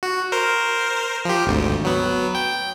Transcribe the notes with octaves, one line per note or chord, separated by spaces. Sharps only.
F#4
A#4 C5
F3 G4
G#1 D2
F#3 B3
G5